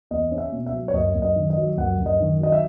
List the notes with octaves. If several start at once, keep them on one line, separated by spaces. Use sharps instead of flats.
E2 D#5
C#4
E5
B2
E5
F#3
C#5
F#2 D#5
F#2
D#5
D#3
D#5
F#3
F#2 F#5
F#2
D#5
D#3
F#3 D#5
E5